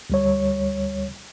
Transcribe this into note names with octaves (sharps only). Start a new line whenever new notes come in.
D2 G3 C#5